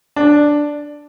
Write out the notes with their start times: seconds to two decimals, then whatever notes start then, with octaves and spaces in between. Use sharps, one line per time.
0.16 D4